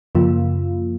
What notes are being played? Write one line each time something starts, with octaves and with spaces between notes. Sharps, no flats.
F#2 C#3 F3 A#3 F4